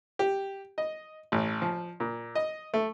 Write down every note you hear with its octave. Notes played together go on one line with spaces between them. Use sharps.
G4
D#5
A1
F3
A#2
D#5
A3